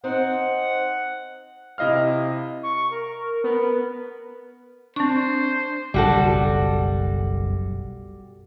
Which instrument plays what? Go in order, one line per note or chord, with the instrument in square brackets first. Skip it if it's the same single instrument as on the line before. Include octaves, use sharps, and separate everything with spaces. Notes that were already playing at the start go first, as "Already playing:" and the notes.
[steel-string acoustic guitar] C4 D#4 C5 [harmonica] F#5
[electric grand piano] C3 E4 D#5 F5 F6
[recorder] C#6
A#4
[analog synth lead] B3
[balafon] C4 C#6 [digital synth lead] D4 [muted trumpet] C5
[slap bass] F#1 B1 F#2 [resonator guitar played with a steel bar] G3 F#4 A4